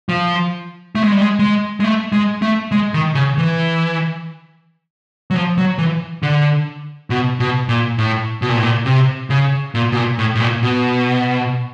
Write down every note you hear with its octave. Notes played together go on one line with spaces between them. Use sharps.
F3
A3
G#3
G3
G#3
G#3
G#3
A3
G#3
A3
G#3
D#3
C#3
E3
F#3
F3
F#3
E3
D3
B2
B2
A#2
A2
B2
A#2
A2
A#2
C3
C#3
A#2
B2
A#2
A2
A2
A#2
B2